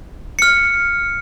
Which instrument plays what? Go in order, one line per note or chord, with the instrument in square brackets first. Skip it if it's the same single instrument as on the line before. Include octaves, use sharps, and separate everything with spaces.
[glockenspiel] F6 C#7